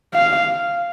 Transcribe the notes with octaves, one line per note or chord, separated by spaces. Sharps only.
F5